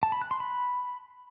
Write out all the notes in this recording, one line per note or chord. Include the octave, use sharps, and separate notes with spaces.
A5
B5
F#6
C6
B5